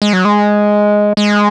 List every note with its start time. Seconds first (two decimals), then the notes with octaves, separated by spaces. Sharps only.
0.02 G#3
0.13 F#3
0.25 G#3
1.17 G#3